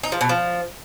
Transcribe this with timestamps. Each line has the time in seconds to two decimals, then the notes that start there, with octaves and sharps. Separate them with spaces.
0.03 D#4
0.12 F3
0.21 B2
0.29 F3